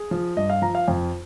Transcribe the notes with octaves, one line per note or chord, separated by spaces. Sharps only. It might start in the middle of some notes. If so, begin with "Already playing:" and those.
Already playing: G#4
F3
G2 D#5
F5
F3 A#5
F5
F2